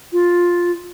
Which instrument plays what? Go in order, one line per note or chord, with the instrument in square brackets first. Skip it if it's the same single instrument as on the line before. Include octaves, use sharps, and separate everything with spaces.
[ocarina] F4